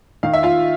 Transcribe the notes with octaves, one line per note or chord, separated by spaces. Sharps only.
D#3 F5
E5
F4 F5